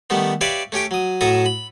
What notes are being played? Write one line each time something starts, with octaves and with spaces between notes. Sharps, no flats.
D#3 G3 A3 B3
G4 B4 C#5 D5 E5 F5
A3 C#4 G4 G5
F#3 D#6
A2 F#3 A4 E5 A#5 D#6
B5